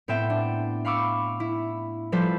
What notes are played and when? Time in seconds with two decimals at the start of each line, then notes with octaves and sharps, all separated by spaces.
0.08 A2 B3 C4 E5 G5 E7
0.30 D4
0.85 F5 B5 C#6 D6 E6
1.40 E4
2.12 F3 G3 A4 B4 C5